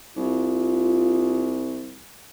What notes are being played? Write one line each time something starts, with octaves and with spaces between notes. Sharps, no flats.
C2 F4